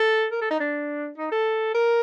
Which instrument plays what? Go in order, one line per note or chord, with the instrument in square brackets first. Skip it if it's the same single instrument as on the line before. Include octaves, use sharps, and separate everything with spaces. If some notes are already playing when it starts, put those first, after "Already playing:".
Already playing: [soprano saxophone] A4
A#4
A4
D#4
D4
D#4
A4
A#4